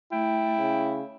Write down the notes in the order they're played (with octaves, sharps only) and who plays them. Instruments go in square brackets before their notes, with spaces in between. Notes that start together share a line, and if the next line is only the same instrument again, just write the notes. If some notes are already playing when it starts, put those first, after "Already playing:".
[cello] A3 [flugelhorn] E4 [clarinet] G5
[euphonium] C#3